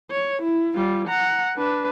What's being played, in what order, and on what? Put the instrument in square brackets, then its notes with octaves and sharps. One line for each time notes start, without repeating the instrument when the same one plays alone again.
[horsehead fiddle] C#5
E4
G3 F4
F#5 A#5
D4 B4